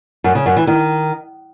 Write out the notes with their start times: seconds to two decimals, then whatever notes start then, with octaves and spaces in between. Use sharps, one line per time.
0.24 F#2
0.35 C#3
0.46 F#2
0.57 E3
0.67 D#3